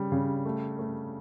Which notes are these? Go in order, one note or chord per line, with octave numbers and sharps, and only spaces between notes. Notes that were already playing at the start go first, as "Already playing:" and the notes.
Already playing: C#3 G3
C#3
A3
A3